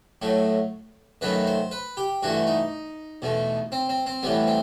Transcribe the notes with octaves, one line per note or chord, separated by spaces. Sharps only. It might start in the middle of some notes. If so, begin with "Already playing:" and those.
A2 F#3 A3
F#2 D#3 F#3 A3 B4
C5
B4
G4
G2 E3 A3 F#4
D#4
E2 B2 A3
C4
C4
C4
A2 E3 G3 B3
C4